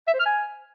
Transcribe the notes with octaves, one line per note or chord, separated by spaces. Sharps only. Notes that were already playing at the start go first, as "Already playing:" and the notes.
E5
C5
F6
G#5